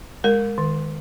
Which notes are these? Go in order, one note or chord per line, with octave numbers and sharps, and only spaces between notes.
G#3 A#4
D#3